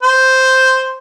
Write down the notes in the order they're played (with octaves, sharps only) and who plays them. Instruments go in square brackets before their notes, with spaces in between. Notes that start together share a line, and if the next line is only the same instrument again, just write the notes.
[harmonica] C5